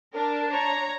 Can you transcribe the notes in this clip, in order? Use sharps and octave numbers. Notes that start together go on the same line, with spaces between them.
D4 A#4 A5
C#5 A#5